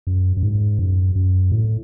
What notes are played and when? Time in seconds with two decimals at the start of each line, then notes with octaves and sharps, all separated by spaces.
0.07 F#2
0.37 F#2
0.43 G#2
0.79 F#2
1.15 F#2
1.52 A2